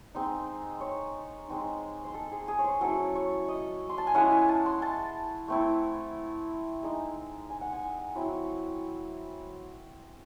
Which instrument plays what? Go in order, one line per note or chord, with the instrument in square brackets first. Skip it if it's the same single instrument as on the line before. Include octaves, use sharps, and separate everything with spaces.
[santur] G#3 C4 D#4
C#5
G#3 C4 D#4
C5
A4
G#4
G#4
C#5
C5
F#3 C#4 E4 A4
C#5
D#5
C6
A5
G#5
G#3 C#4 E4 F#5
G#5
A5
C6
A5
A3 C4 E4
G#3 D#4
G#5
F#5
G#5
F#3 C4 E4 F#5